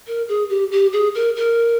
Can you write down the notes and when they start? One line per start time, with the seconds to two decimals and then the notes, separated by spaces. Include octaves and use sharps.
0.07 A#4
0.28 G#4
0.49 G4
0.71 G4
0.93 G#4
1.14 A#4
1.36 A#4